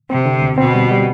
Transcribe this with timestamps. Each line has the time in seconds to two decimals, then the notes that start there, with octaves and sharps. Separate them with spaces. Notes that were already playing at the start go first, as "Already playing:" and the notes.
0.10 C3 C4
0.25 D3
0.42 D2
0.58 B2 C4
0.74 G3
0.91 G3